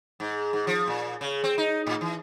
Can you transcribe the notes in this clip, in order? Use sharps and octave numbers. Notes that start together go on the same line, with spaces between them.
G#2
G#2
F3
A#2
C#3
C4
D#4
A2
E3